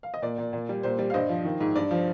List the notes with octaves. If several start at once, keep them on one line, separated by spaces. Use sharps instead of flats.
F5
D#5
A#2 D5
A#2
A#2
G3
A#2 C5
G3
F5
G2 C5 D#5
F3
D#3
G#2
G2 D5
F3